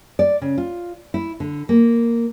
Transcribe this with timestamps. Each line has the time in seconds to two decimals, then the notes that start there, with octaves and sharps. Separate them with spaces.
0.19 D5
0.42 C#3
0.58 F4
1.14 E4
1.40 D3
1.69 A#3